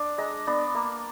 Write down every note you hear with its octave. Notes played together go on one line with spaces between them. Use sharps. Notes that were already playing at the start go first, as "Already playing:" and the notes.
Already playing: D4
G#3 A#5
B3 D4
A#3